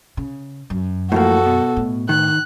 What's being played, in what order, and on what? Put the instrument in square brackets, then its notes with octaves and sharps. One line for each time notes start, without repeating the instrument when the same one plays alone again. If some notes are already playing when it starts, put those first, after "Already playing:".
[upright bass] C#3
F#2
[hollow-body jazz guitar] A2 F3 A#3 [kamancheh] F#4 A4
[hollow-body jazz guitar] B2
[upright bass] A2
[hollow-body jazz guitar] D#3 [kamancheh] F#6